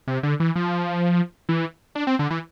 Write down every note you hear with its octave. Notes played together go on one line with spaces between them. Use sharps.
C3
D3
E3
F3
E3
D4
C4
D3
E3